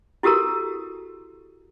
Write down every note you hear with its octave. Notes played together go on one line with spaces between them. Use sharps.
E4 F#4 G4 A4 A#4 A#5